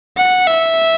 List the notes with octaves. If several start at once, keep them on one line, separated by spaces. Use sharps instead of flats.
F#5
E5